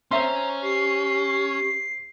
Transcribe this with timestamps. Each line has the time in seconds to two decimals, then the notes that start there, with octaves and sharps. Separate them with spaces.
0.11 C4 C#4 E5 A#5 C6
0.63 G4 C7